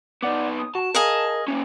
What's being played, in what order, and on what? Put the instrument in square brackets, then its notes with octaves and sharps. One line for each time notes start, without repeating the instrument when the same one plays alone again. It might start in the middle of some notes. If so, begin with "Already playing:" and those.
[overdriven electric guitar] B3 D#4 [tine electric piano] D5 F#5 D6
[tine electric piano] D#6
[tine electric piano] F#4 [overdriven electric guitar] A5
[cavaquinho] G#4 D#5 F5 [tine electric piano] A#4
[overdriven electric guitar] A#3 C#4